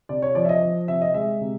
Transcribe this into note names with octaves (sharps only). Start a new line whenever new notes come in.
C3 D5
C#5
F3 D5
E5
D#5
F3
C3 E5
D#5
G#3 E5
C3